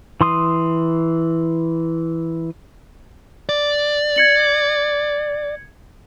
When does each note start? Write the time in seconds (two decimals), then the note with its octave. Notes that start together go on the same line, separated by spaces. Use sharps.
0.21 E3 C6 D#6
3.49 D5
4.16 G#6 C#7 F#7